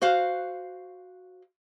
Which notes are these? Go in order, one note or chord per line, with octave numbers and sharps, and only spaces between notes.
F#4 C5 F5